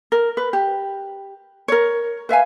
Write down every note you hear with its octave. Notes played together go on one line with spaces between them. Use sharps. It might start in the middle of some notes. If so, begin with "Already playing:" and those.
A#4
B4
G4
A#4 C#5
B4 E5 F5 G#5